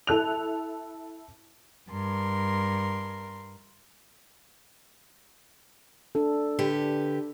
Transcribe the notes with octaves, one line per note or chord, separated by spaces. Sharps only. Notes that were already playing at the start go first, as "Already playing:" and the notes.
E4 A4 F#6 F7
G2 A#4 C6
D4 A4
D3 G4 B4